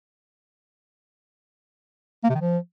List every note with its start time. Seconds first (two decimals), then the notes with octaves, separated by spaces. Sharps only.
2.24 A#3
2.30 C3
2.35 D#3
2.41 F3